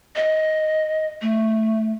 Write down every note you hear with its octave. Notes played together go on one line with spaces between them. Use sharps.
D#5
A3